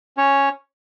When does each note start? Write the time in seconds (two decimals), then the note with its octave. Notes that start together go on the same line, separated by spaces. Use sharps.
0.17 C#4 C#5